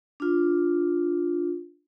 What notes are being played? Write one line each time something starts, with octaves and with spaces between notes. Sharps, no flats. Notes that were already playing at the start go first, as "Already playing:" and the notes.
D4 F4